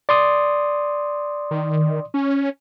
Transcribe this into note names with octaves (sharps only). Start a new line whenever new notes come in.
D5 C6 D#6
D#3
C#4